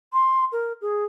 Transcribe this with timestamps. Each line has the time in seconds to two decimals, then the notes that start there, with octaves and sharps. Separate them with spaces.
0.13 C6
0.52 A#4
0.82 G#4